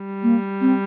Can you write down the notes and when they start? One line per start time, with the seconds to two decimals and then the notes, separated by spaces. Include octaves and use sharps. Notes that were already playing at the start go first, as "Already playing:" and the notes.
Already playing: G3
0.23 A#3
0.61 C4